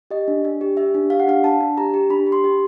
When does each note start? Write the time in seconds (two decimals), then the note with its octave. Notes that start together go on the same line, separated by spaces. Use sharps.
0.11 G4 D#5
0.28 D4
0.45 D4
0.61 G4
0.77 G4 E5
0.95 D4
1.10 G4 F5
1.20 F#5
1.28 D4 F5
1.44 D4 A5
1.60 D4
1.78 G4 A#5
1.94 G4
2.10 D4 B5
2.26 G4
2.32 C6
2.44 G4